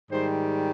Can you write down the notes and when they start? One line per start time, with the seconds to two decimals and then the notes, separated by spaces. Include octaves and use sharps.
0.11 G#2 D#3 G3 C5